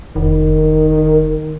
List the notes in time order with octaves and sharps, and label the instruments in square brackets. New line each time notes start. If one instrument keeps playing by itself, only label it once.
[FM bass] F1 [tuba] D#3